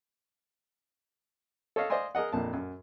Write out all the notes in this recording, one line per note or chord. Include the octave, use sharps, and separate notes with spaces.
A4 C#5 D#5 F5
C5 D5 D#5 F5 G#5 C6
G#4 A#4 D#5 F#5
A#1 F2 A#2 A5
F#2